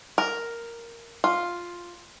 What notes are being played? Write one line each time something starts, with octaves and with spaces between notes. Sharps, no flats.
A#4
F4